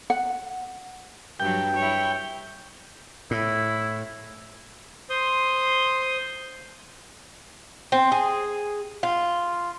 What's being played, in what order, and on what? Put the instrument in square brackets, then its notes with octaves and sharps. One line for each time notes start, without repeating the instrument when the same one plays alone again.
[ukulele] F#5
[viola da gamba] G2 F#3 [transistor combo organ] G5
[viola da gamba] E4 C#5
[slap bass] A2 [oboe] E4
[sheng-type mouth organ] C5 C6 D#6
[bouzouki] C4
G#4
F4